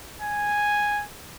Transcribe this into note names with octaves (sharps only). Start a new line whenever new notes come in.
G#5